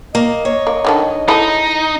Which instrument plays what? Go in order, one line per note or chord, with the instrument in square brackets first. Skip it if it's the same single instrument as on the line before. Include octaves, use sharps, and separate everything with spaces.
[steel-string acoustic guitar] A#3 [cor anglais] D#5
[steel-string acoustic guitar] C#5
[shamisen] A#3
D3 D#3 A4
[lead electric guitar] D#4 [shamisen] E4 G#4 A4